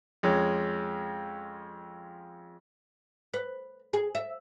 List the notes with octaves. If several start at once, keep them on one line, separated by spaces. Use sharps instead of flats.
F2 G#3 C#4
B4
G#4
E5